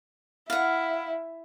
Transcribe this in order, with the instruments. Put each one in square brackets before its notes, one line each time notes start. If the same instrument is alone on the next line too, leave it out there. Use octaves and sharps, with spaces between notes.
[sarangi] E4 [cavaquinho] F5 F#5